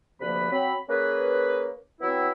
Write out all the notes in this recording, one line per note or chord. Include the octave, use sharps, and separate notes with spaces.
D2 C3 F3 A#3 B4 B5
F#3 C4 B5
A#3 C#4 G#4 B4
F#3 B3 C4 E4